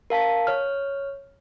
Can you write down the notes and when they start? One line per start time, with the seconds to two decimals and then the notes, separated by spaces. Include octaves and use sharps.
0.10 A#4 F5 A5 B6
0.47 C#5 F6